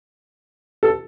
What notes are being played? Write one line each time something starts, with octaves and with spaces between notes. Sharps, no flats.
A4